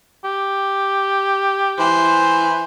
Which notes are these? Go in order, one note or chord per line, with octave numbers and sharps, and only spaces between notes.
G4
E3 C5